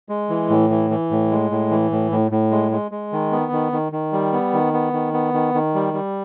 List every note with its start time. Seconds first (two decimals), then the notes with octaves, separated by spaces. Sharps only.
0.09 G#3
0.30 E3
0.50 A2
0.70 E3
0.90 E3
1.11 A2
1.31 G#3
1.51 A2
1.71 E3
1.91 A2
2.11 A2
2.31 A2
2.51 G#3
2.72 G#3
2.91 G#3
3.13 D#3
3.32 B3
3.52 D#3
3.72 D#3
3.92 D#3
4.13 G3
4.33 B3
4.54 D#3
4.74 B3
4.93 D#3
5.13 B3
5.34 D#3
5.54 D#3
5.74 G3
5.94 G3